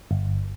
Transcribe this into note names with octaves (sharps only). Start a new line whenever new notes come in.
G1